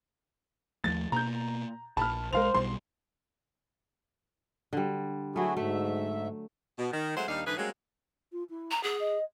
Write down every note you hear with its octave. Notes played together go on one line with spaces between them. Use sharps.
D#2 F3 A3 A6
B2 A#3 A#5 G6
A#1 A5 B5 F6
B1 D#3 G#3 A#4 C5 F5 F7
B1 B2 G3 C6
D3 G3
F#3 A3 E4 F#4 G#4
G#2 A3 E5
B2
D#3
F#3 G#3 A3 C4 F#4 C5
D#2 G3 D4 D#4 F5
G#2 D3 E3 G#4 B4
G3 G#3 A#3 C4 C#4 F#4
F4
E4
A#5
G#4 F#5
D#5